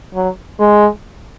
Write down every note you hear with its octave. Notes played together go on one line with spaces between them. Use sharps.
F#3
G#3